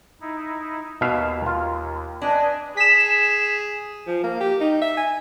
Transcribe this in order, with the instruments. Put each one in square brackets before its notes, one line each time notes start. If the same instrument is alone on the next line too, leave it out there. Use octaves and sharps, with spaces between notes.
[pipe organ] D#4 E4
[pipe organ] D#2 [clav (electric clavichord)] B2 E5 F5
[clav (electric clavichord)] F4
[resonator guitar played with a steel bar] D4 [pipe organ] B4 D#5 G#5
[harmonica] G#4 [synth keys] B6 E7
[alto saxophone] F3
A#3
G4
D#4
E5
G#5